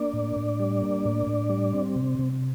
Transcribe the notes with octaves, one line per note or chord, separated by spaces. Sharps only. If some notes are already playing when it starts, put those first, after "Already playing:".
Already playing: A#3 D4 D5
A2
A2
G3
A#3
A2
A2
G3
C4
C3
C3